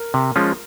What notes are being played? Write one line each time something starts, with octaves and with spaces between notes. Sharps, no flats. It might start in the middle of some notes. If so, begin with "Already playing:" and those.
Already playing: A#4
C3
F3 G#3 C#4 F4